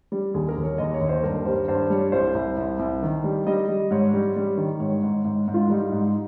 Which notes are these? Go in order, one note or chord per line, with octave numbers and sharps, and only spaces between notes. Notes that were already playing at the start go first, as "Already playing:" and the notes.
G3
D#2 G#4
A#4
D#2
C#5
D#2 D#5
C#5
D#2
C5
G2 A#4
G3 C5
G2 C5
G3 C#5
C2 C5
C2
C2
C2
D#3
G3
G3 D#5
G3
G#2 C#5
G3
G3
D#3
G#2 C#5
G#2
G#2
G#2
F4
G3 D#4
G#2